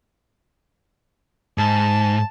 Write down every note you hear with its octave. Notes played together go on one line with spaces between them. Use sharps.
G#2 A5